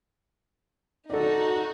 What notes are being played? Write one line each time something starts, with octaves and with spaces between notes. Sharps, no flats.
D#4 F#4 A4 D5